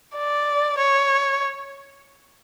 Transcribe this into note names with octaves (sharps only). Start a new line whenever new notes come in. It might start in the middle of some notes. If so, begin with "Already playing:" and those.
D5
C#5